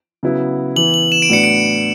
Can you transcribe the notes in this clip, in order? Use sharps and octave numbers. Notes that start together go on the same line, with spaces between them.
C#3 F#3 B3 E4
E3 B3 E4 F#7
F#7
E7
D7
A2 F#3 B3 D4 C#7
D7